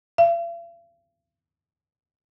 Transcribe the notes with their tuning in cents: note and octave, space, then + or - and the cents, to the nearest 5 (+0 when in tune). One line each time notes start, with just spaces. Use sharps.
F5 -45